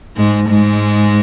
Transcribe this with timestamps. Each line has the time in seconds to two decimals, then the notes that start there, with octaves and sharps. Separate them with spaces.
0.17 G#2 G#3
0.49 G#2 G#3